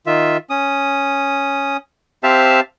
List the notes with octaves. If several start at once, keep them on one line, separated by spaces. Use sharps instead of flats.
D#3 F4 E5
C#4 D#6
C4 G4 C5 E5 F5 A5